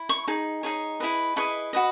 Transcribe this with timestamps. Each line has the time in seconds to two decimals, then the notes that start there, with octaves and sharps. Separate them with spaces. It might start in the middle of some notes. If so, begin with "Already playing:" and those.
Already playing: E4
0.09 C#6
0.28 D#4 G#4
0.63 D#4 G#4 C#5
1.00 E4 G#4 B4 D#5
1.36 E4 G#4 B4 D#5 C#6
1.73 F#4 B4 D#5